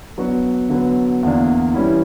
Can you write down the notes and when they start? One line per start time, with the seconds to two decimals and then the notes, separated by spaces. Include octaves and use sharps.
0.18 F#3 B3 D4 F#4
0.70 D3 F#3 B3
1.23 E2 D3 A#3 D4
1.74 E3 G3 C#4 E4